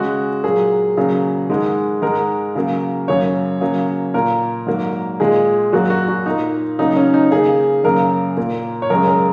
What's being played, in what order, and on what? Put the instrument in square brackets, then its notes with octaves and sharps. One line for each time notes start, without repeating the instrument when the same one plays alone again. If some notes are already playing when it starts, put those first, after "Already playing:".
Already playing: [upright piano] C#3 G#3 F#4
A#2 F#3 A#3 G#4
C#3 F#3 A#3
G#2 D#3 G#3
G#2 G#3 A#4
C#3 F#3 A#3
F#2 C#3 F#3 A#3 C#5
C#3 F#3 A#3
A#2 A#3 A#4
G#2 F#3 A#3
A#2 G#3 G#4
F#2 F#3 A#3 F#4
F#4
F#4
A#2 A#3 D#4
C#3 F#3 A#3 D#4
C#4
D#4
C#3 A#3 G#4
F#2 C#3 A#3 A#4
A#2 A#3
C#5
F#2 C#3 G#3 A#4
A#4